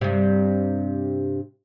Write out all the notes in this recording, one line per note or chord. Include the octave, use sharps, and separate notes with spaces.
G2 C3